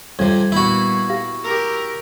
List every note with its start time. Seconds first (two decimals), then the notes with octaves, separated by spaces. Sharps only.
0.19 F2 C3 G3 G#6
0.52 A#2 B3 E4 F#4
1.09 G4 F5 A#6
1.44 G4 A#4 E6